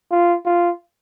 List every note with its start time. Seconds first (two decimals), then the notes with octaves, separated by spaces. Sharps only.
0.11 F4
0.45 F4